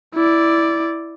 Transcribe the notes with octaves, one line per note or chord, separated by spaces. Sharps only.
E4 D5